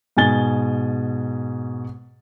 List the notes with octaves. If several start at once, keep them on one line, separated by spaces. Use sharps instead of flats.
G#2 B2 G#5 A6 G7